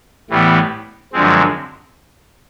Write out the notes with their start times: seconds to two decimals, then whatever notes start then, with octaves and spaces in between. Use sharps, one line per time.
0.30 A2 E3 G3 B3
1.13 F#2 D3 F3 G#3 C4